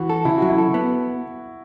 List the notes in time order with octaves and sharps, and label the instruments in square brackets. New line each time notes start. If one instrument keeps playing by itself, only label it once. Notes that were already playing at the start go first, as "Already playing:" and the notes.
Already playing: [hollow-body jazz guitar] E3 [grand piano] F#4
[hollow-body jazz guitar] A4
[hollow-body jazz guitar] C#3 [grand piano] E4
[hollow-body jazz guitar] F#3 [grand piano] F#4
[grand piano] E4
[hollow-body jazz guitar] A4
B3